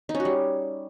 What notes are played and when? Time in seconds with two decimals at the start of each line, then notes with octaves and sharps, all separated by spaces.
0.09 D#4
0.14 C#4
0.20 F#4
0.25 G3